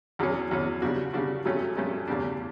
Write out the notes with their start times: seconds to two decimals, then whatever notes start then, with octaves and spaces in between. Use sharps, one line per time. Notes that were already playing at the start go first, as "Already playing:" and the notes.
0.19 E2 B2 F#3 C#4
0.51 E2 B2 F#3 C#4
0.82 C#3 G3 D4 F#4
1.13 C#3 G3 D4 F#4
1.45 G2 F#3 A3 C#4
1.77 G2 F#3 A3 C#4
2.08 E2 C#3 G3 D4